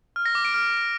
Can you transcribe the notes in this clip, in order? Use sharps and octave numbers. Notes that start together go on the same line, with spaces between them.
F6
A#6
D6
D7
F6